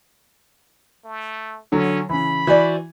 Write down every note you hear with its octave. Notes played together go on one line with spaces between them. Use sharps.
A3
D3 F#3 C#4
C#3 E3 B5
E3 F#4 C5 D5